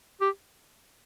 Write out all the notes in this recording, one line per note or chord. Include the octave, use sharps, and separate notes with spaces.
G4